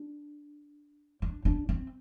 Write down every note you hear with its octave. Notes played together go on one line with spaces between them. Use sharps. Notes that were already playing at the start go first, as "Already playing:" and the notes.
Already playing: D4
D4
D4
C4